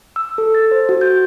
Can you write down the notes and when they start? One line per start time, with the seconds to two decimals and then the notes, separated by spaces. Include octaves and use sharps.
0.16 E6
0.38 A4
0.55 A6
0.71 C5
0.89 F#4
1.01 G6